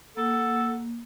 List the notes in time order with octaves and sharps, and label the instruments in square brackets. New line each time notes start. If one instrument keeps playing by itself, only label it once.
[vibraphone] A#3 [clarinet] A4 [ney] F#5